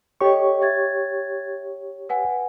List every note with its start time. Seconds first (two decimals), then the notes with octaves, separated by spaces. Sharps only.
0.21 G4 A4 C#5 D#5 C#6
0.62 E5 G#6 A6
2.09 B4 F#5 G#5